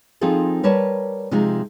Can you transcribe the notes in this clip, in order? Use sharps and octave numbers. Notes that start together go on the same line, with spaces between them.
F3 C4 D#4 F4 G#4 A4
G3 A#4 B4 C#5 A5
C3 F3 G#3 D#4 F4